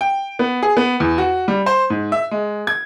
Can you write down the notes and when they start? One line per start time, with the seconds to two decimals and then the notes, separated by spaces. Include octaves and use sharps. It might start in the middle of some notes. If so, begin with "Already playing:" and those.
0.01 G5
0.39 B3
0.63 G#4
0.77 B3
1.00 E2
1.18 F#4
1.48 G3
1.66 C5
1.90 G#2
2.12 E5
2.31 G#3
2.67 G#6